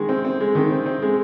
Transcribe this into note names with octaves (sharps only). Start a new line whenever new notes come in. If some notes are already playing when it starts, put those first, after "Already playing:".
Already playing: D#3 G#3
C4
C4
G#3
D#3
C4
C4
G#3